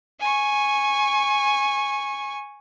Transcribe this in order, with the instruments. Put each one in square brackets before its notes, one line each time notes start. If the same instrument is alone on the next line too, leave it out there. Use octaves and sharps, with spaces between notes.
[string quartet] G#5 C#6